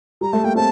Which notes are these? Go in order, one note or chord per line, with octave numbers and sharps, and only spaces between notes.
G3 A#5
A3 A5
A#3 G5
C4 A5